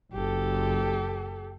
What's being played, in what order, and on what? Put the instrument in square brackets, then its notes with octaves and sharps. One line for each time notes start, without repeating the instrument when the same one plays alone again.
[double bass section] F#1 [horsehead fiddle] G4 A4